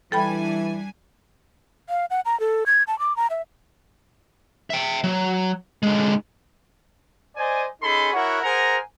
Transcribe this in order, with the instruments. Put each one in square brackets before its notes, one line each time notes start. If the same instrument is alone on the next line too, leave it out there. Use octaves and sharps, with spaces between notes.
[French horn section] E3 [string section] G3 D4 G#5 [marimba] A4 G5 B5
[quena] F5
F#5
A#5
A4
G#6
A5
D6
A#5
E5
[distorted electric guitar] E5 G5
F#3
D3 G#3
[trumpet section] C5 D5 D#5 G#5
C#4 D#4 G#4 A4 B5 C6
E4 F#4 A#4 C#5 F#5
G#4 A#4 C5 F#5 G#5 A#5